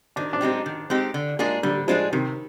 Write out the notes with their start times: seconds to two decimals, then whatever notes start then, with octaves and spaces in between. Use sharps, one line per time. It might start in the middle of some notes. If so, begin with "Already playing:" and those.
0.16 D#3 D4
0.33 D4
0.41 G#3 C4 D#4 G4
0.66 D#3
0.90 G#3 C4 D#4 G4
1.14 D3
1.39 G#3 A#3 D4 F4 G#4
1.63 D3 G3
1.88 F3 G#3 D4 F4 G#4
2.13 C3 D#3